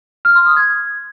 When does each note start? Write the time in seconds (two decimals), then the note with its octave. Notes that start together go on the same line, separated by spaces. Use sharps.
0.25 F6
0.35 C6
0.46 D#6
0.57 G#6